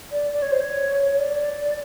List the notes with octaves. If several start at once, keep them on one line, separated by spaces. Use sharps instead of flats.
D5
D5
C#5
C5
C#5
C#5
D5